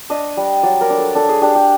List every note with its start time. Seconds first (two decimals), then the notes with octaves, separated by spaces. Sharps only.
0.10 D4 D#5
0.37 G3
0.63 F#3 D5
0.81 A#4
0.90 D4
0.98 A4
1.15 D4 A4
1.29 G#4
1.42 D4 G4
1.55 G4